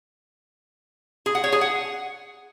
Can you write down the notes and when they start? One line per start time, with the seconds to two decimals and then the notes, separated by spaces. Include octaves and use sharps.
1.26 G#4
1.35 F#5
1.44 C#5
1.52 G#4
1.61 F#5